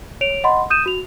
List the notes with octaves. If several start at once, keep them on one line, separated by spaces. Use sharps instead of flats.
C#5 D7 F7
D#5 F#5 B5 C6
D#6 G6 D#7 E7
F#4 F7